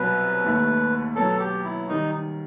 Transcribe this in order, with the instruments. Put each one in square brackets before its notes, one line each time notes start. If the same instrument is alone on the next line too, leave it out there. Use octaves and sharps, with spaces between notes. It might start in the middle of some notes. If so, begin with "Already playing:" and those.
Already playing: [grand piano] C2 B2 F#3 [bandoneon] B4
[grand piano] D#2 D#3 A3
[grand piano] B2 F#3 B3 [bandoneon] A4
[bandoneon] G4
E4
[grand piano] D#3 G3 [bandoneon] D#4